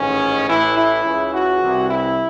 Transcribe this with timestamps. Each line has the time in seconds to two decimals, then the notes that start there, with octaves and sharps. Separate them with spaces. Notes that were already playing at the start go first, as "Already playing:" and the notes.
Already playing: A1 G#2 D#3 C#4
0.48 A1 A2 E3 E4
0.77 E4
1.05 C#2 C#3 E3
1.34 F#4
1.62 C2 C3 E3
1.90 E4